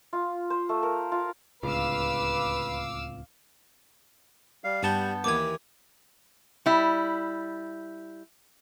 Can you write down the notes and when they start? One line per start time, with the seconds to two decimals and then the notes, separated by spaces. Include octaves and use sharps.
0.13 F4
0.50 C5
0.69 A3
0.83 A#4
1.12 F4
1.63 D1 C#2 B4 F5 D6 E6
4.64 G3 F5
4.83 G2 G3 B3 F#4 A5 G6
5.24 D#2 E3 D6 G#6
6.66 G3 E4